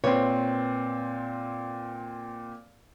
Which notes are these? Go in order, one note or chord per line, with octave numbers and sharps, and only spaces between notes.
A#2 C4 B4 C#5